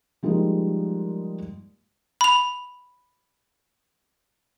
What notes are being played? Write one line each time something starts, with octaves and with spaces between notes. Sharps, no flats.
F3 G3 G#3 A#3 D#4
B5 F7